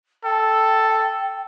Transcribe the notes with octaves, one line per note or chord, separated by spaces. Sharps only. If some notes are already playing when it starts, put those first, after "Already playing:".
A4 G5